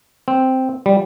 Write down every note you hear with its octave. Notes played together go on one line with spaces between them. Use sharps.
C4
G3